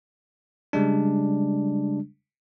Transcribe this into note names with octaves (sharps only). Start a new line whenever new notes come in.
C#3 G3 G#3 D4